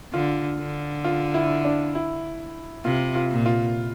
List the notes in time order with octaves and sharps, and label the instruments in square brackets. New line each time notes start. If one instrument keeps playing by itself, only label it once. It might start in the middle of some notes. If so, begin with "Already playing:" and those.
[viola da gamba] D3 [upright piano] F4
[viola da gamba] D3
[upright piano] F4
E4
D4
E4
[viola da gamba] C3 [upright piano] F4
[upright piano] F4
[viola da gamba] A#2
[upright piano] F4